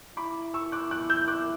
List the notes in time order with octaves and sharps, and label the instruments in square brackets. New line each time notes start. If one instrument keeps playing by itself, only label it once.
[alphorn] E4 [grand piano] B5 D6
[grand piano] C#6 E6
D6 F#6
D6 F#6
E6 G6
D6 F#6